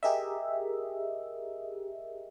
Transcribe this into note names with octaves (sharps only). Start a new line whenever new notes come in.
G4 G#4 A#4 D#5 E5